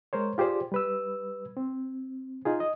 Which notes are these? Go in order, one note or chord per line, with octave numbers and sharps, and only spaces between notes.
G#3 A#4 C5 C#5
F4 G4 G#4 C5 D5
G3 B4 E6
C4
D#4 F4 G#4
D#5